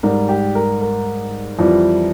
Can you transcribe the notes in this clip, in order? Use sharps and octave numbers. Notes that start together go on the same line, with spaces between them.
G#2 G3 A#4
G4
A#4
A#4
F2 E3 G3